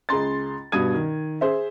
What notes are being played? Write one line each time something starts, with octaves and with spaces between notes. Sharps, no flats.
C#2 G#4 A#5 C6 A6
G2 B2 D#6 G#6 D#7
D#3
G#4 C5 E5